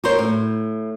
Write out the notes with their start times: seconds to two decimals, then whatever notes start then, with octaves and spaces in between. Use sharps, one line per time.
0.04 F#4 A#4 C5 C#5
0.18 A2